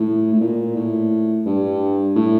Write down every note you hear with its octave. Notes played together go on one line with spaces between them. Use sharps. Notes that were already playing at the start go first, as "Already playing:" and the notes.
Already playing: A2
A2
A#2
A2
G2
A2